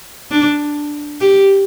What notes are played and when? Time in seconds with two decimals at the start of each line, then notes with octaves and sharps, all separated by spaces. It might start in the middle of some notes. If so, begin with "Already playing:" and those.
0.31 D4
1.21 G4